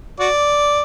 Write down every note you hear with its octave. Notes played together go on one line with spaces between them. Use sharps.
F#4 D5